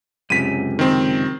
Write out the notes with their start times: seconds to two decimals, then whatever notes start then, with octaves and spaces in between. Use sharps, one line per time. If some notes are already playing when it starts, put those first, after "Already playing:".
0.30 C#2 F#2 C3 B6 D#7
0.79 D#3 C4